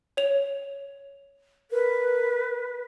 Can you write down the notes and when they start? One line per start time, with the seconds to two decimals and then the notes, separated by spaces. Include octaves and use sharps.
0.17 C#5 F7
1.71 A#4 B4